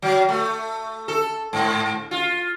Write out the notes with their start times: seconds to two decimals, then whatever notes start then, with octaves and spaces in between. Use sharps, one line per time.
0.02 F#3
0.29 A3
1.08 A4
1.53 G#2
2.11 F4